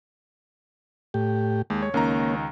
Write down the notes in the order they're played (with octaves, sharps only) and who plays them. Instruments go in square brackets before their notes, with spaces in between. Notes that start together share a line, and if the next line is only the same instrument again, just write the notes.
[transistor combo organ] A2 G4
[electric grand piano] D#2 [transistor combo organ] G#3
[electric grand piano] C#5
[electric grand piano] C#2 D#3 A#5 [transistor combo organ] A#3 C#4